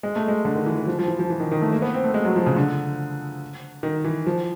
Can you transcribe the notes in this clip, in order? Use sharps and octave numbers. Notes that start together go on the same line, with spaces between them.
G#3
A3
G#3
D3
D#3
E3
E3
F3
F3
E3
F3
E3
D#3
D#3
A3
A#3
B3
C4
A3
G#3
F#3
F3
C#3
D3
D#3
E3
F3